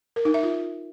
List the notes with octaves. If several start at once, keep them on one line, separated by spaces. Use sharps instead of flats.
A#4
D#4
E5
F4